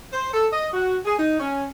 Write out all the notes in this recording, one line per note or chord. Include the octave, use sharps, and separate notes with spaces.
C5
A4
D#5
F#4
G#4
D#4
C#4